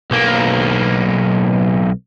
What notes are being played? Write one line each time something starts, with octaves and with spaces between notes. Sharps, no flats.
B1 A#3